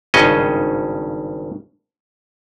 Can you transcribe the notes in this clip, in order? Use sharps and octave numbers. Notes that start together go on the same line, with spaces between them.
G#1 G2 C#3 C#4 D#5